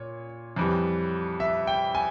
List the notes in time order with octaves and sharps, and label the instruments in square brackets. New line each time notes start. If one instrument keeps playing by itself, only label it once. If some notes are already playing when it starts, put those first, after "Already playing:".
Already playing: [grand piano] A#2 C#5
F2 E3 G3
E5
G5
G#5